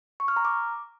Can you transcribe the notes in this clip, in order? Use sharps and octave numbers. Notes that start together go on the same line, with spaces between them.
C#6
F6
A#5
D6